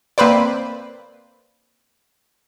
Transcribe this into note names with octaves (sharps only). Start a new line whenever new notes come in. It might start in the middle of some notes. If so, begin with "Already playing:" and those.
A#3 C4 B4 C5 D5